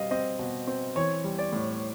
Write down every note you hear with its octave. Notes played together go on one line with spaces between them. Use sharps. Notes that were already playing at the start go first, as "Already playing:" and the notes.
Already playing: B2 G3 C4 D#5 F5
C4 D#5
B2
C4
E3 C#5
G3
D5
A2